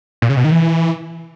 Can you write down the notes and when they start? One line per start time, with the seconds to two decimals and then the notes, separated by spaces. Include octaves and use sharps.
0.22 A#2
0.29 C#3
0.37 B2
0.44 D#3
0.52 E3